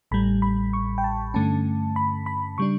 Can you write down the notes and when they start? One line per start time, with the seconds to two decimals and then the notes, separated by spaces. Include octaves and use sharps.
0.11 A1 A2 G3 B5
0.42 B5
0.73 C#6
0.98 G5
1.04 A5
1.34 G2 D3 A3 C#4 A5
1.96 B5
2.26 B5
2.58 C#3 G3 D4 C#6